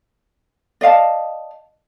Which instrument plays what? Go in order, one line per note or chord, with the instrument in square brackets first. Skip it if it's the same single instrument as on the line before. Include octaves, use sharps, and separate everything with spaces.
[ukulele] D5 D#5 F5 A5